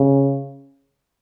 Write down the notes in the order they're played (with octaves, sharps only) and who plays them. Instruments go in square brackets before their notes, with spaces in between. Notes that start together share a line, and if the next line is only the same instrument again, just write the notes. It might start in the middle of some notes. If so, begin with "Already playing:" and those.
Already playing: [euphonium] C#3